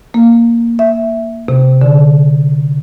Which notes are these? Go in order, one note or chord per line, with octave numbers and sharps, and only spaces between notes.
A#3
E5
C3
D3